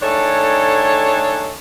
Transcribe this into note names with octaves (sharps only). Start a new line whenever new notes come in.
D#3 A3 D4 G#4 A4 C#5